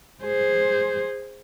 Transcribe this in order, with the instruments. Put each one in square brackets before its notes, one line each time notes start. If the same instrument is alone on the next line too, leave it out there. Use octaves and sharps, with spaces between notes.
[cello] G#4 C5